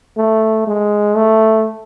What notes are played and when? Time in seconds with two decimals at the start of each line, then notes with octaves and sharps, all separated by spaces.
0.17 A3
0.67 G#3
1.16 A3